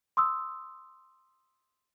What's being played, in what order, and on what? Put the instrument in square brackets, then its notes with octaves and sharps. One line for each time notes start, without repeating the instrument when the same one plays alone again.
[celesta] C6 D#6 E6